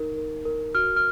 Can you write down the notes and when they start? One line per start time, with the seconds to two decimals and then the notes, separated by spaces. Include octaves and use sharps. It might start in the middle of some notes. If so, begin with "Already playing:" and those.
Already playing: D#4 A#4
0.17 A#4
0.45 A#4
0.75 F#4 F6
0.96 F6